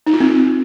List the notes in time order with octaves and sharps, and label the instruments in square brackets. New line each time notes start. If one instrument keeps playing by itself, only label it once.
[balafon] D#4
F4
C4